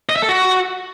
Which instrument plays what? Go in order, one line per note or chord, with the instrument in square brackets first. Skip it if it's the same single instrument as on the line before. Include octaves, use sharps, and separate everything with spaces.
[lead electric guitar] D#5
E5
A4
F#4